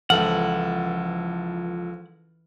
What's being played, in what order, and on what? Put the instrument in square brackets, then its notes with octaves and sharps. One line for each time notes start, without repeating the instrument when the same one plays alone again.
[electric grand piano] C#2 A4 F6 [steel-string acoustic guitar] E3 [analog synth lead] F3 [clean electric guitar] F#5